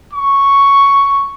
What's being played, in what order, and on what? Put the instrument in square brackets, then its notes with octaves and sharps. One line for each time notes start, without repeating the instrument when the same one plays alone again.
[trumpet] C#6